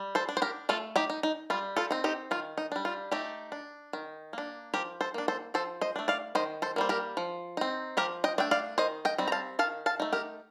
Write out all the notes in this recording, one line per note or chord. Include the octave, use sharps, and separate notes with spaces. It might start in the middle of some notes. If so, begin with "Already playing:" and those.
Already playing: G3
A4 C5
D4
C5
G4 A#4
A3 F4 A4
D#4 G4
D#4
D#4
G3 F4
F4 A4
C4 D#4
D#4 G4
D#3 F4
D#4
G3 D4
F4
A3 D#4 G4
D4
D#3
A#3 D4
F3 G4 A#4
A4 C5
A#3 D4
A4 C5
F3 A4 C5
C5 D#5
A3 D4
D5 F5
D#3 C5 D#5
A4 C5
G3 A#3 C5
G4 A#4
F3
C4 D#4
F3 G4 A#4
D#5 G5
A3 D4 G5
D5 F5
D#3 C5 D#5
D#5 G5
G3 C4 D#4
A#5
F5 A5
D#3 F5 A5
F5 A5
A3 D#4
G4 A#4